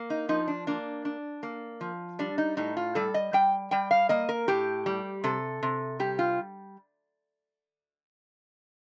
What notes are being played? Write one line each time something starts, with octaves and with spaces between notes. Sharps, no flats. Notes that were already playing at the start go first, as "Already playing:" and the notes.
Already playing: A#3
D#4
F3 D#4
D4
A#3 D4
D4
A#3
F3
G3 D4
D#4
A2 D#4
F4
G3 A4
D#5
G3 G5
G3 G5
F5
A#3 D#5
A#4
A2 G4
G3
C3 A4
C3
G3 G4
F4